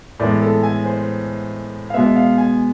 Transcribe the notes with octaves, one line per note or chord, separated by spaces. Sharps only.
A2 E3 G#3 B3 D5
A4
G#5
C5
F5
B2 G#3 B3 E5
F5
G#5